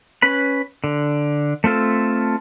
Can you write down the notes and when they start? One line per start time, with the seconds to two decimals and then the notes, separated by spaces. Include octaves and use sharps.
0.22 C#4 B4 B5
0.84 D3
1.64 A3 C4 F4 A4